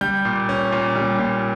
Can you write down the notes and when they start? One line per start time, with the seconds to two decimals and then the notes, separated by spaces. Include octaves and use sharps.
0.01 G3 G6
0.25 A#2
0.49 C#4
0.72 A#2
0.96 G3
1.19 A#2